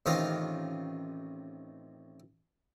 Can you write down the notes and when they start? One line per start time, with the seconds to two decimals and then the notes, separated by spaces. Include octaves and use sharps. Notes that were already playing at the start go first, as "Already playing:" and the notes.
0.06 A1 C3 D#3 F4 D#5 F5